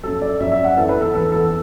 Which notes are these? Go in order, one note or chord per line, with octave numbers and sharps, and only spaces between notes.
F#2 F#3 A4
D5
F#2 F#3 E5
E5
F#5
E2 E3 A4
B4
A4
E2 E3 A4
A4